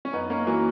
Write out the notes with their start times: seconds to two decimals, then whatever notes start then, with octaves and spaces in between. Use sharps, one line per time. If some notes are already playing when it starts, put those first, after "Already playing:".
0.05 C#4
0.13 F#2 B3 D#4
0.30 A#3 C#4
0.46 E3 F#3 A#3